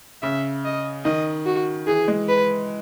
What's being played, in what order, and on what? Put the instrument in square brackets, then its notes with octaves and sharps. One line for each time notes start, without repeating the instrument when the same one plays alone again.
[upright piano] C#3 [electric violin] E5
[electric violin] D#5
[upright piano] D#3 [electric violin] D#5
[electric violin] F#4
[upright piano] E3 [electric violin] G#4
[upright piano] G#3
[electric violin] B4